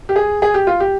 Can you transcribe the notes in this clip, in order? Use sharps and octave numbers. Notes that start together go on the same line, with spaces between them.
G4
G#4
G#4
G4
F4
G4